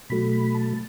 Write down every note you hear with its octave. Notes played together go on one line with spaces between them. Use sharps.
B2 F#3 A3 B5
B5
A5